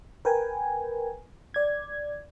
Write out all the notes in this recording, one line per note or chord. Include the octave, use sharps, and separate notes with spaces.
A#4 B4 G5 G#5
D5 G#6